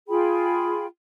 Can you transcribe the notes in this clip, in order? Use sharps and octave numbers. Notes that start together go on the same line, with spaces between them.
F4 G#4 G5 B5